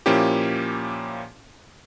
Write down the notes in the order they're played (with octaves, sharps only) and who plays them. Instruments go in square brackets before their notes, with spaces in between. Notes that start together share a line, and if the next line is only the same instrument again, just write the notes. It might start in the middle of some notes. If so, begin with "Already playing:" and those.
[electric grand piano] A#2 F3 A#3 C#4 E4 G4